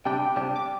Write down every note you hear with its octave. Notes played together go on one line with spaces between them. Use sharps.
C3 G3 D4 G4 G5
C3 G3 D4 G4
D6